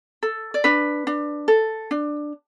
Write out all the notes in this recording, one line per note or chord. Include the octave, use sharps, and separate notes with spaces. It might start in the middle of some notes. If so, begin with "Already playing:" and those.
A4
D5
D4 B4
D4
A4
D4